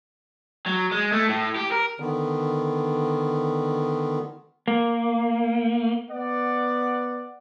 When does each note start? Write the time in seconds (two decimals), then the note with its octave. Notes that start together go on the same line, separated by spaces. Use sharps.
0.66 F#3
0.91 G#3
1.12 A3
1.29 A2
1.56 G4
1.72 A#4
2.00 D3 D#3 B3
4.68 A#3
6.10 B3 D5 F#5